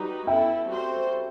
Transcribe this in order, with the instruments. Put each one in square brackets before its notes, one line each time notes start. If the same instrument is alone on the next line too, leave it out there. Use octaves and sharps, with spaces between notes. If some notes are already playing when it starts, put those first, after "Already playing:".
Already playing: [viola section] G3 D#4 F#4 B4
[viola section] B3 E4 A4 [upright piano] E5 G5
[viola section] G3 C4 F#4 A4 C5